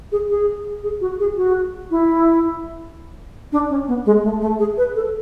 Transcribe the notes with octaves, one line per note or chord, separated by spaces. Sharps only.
G#4
G#4
G#4
F#4
G#4
F#4
E4
D4
C#4
B3
G#3
A3
A3
G#4
B4
A4